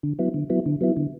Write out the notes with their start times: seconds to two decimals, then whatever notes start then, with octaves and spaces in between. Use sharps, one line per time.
0.03 D3
0.19 F#3 B3 E4
0.34 D3
0.50 F#3 B3 E4
0.66 D3
0.81 F#3 B3 E4
0.97 D3